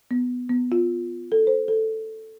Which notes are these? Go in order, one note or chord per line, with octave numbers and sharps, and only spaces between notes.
B3
B3
F4
A4
C5
A4